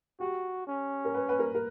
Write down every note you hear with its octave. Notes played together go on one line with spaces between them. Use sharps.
F#4 G4
C#4
A#4
B4
B4
A#4
A#4